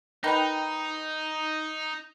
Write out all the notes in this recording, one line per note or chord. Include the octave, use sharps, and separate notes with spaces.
D#3 D#4 B4 G5